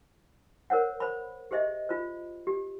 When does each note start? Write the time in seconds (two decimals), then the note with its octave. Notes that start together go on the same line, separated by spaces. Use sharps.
0.70 A#4 C5 C#5 F#5
1.00 C5 B5
1.51 G4 G#4 C5 D#5 E5
1.89 F4 C5
2.47 G4